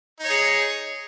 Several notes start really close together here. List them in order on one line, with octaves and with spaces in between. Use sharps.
D#4 C#5 G#4